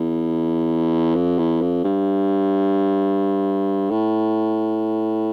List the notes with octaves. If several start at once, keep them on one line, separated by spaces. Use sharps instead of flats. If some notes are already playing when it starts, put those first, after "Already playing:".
Already playing: E2
F2
E2
F2
G2
A2